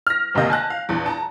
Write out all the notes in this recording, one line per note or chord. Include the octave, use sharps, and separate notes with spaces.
F6 A#6
G#1 D2 C3 A#3 D#5 G6
G#5 A5 F#6 A#6
F5
A#1 E2
A5 A#5